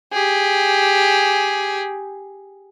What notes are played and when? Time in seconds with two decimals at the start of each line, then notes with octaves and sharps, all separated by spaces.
0.13 G4 G#4